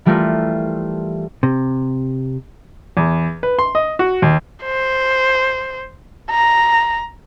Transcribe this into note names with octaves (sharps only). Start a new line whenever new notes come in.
E3 G3 A3 F4 A#4
C3
E2
B4
C6
D#5
F#4
D#2
C5
A#5